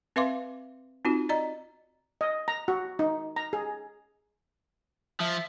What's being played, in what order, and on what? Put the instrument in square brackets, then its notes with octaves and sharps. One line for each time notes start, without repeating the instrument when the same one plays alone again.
[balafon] C4 B4 E5 F5 C6 D6
C4 D#4 F4 F#4
D5 D#5 A#5
[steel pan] D#5
A#5
F#4
D#4
A#5
G#4
[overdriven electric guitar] F3 [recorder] E5